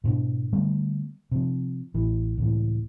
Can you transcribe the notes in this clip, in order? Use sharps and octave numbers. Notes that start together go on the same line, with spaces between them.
G#2 B2 D4
D3 G3 A3 B3
C3 F3
A1 E3
C#2 A2 E3